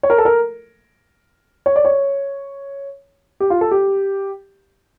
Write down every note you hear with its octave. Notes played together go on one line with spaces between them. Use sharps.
C#5
A#4
A4
A#4
C#5
D5
C#5
G4
F4
A4
G4